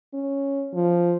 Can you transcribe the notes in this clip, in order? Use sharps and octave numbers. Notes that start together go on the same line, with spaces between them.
C#4
F3